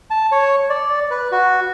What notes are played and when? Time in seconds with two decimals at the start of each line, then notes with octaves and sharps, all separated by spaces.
0.10 A5
0.32 C#5
0.70 D5
1.11 B4
1.32 F#4